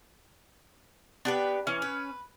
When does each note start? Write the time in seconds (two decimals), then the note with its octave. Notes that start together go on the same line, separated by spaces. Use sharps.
1.25 B3 D4 G4 B4
1.67 E3 C#4
1.82 B4